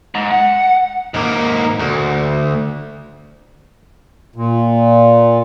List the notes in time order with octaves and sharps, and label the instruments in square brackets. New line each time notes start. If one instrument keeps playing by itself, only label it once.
[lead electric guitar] G#2
F#5
[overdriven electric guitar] G#2 A#3
D2
[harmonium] A#2